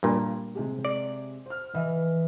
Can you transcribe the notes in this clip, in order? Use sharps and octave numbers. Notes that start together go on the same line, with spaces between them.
G2 A#2
C3 G#3 G4
D5
C5 F6
E3 D#5 E5